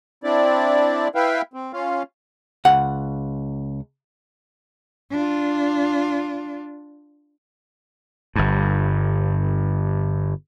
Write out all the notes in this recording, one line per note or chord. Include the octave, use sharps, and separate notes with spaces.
C4 D4 E4 D5
E4 B4 E5 F5 G5
C4
C#4 F4 F5
C#2 F#5
D4 F4
G1 G2